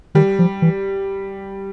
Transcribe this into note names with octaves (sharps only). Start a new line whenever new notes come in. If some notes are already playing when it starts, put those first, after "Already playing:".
D#3 G3
F3
E3